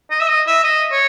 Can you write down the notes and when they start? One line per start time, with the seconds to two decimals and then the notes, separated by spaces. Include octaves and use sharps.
0.11 D#5
0.21 E5
0.29 D#5
0.47 E5
0.64 D#5
0.92 C#5